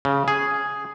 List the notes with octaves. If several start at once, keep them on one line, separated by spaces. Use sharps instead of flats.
C#3
G#4